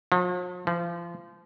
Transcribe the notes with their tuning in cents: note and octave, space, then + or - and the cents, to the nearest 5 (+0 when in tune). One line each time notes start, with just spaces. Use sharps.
F3 +45
F3 -30